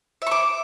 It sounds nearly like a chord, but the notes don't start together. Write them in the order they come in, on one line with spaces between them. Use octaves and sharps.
E5 C#6 D6